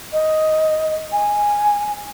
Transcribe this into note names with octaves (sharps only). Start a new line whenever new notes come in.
D#5
G#5